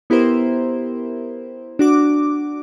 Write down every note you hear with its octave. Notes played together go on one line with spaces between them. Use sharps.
B3 E4 G4 A#4 C5
D4 F#4 D6